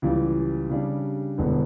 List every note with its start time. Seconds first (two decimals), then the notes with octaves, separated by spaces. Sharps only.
0.02 C#2 C#3 E3 G3
0.70 C#3 G3 D4
1.38 E1 E2 D3 G3 B3